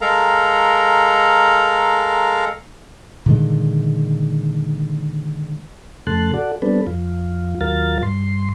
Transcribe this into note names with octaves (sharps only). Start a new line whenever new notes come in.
G#3 A4 A#4 F5 A#5
A#2 D3 D#3 G#3
F2 C#3 A3 A5 C6 F#6
F#4 A4 D5 F#5
G3 B3 C4 D4 A4 B4
F2 F4
D#2 F#3 F4 A#4 F5 A6
G2 C6